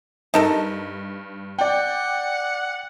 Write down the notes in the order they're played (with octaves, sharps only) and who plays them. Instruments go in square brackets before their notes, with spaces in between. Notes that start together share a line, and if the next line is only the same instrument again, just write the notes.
[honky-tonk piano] G2 [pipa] D#4 A4 A#4
[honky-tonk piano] D5 G5 [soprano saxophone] F#5